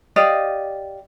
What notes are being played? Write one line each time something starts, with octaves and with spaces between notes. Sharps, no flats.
G4 D5 D#5 F5